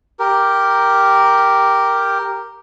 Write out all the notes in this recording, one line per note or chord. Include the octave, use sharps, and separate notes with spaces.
G4 A#4